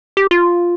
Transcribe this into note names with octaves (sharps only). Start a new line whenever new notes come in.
G4
F4